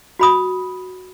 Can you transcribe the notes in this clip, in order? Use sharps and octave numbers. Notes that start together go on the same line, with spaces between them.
F#4 B5 D#6